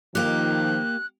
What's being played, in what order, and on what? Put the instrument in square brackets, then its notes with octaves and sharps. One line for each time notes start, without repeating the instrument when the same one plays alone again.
[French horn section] D#3 F3 [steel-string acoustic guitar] A#3 G4 [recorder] F#6